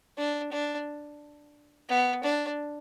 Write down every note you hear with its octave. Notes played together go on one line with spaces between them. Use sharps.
D4
D4
B3
D4